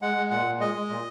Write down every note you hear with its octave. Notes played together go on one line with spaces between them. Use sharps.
G#3 F#5
G#3
A#2 F#5
A#2
G#3 D#5
G#3
A#2